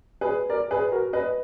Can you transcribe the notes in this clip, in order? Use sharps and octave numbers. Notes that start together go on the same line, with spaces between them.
G#4 B4
A#4 D5
G#4 B4
F#4 A#4
B4 D#5